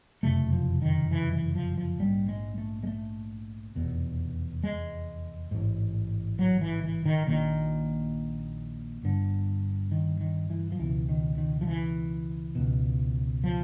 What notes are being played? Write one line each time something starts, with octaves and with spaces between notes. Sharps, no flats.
F#1 F2 C3 A3
F3
D#3
E3
E3
F3
F3
A#1 G#2 G3
G#3
A3
G#3
A3
F1 E2 B2
G#3
A1 G#2
F#3
E3
E3
D#3
A#1 A#2 D#3
G1 G2 D3
D#3
D#3
E3
F3
C#2 B2 E3
D#3
D#3
F3
E3
C#2 B2
F3